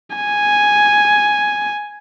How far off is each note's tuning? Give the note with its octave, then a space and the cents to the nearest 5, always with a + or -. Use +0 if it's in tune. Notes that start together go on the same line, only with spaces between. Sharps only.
G#5 +0